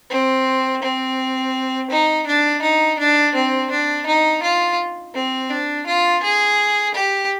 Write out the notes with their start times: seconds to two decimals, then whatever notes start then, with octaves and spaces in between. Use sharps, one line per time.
0.10 C4
0.82 C4
1.91 D#4
2.27 D4
2.62 D#4
2.99 D4
3.35 C4
3.71 D4
4.06 D#4
4.43 F4
5.15 C4
5.50 D4
5.86 F4
6.23 G#4
6.95 G4